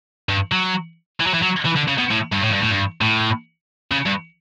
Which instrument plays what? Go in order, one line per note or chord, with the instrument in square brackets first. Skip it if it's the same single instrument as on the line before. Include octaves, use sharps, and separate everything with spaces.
[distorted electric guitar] G2
F#3
E3
F#3
E3
F#3
E3
D3
C#3
B2
A2
G2
A2
G2
A2
G2
A2
C#3
G2